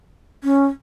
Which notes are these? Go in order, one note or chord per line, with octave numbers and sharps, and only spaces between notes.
C#4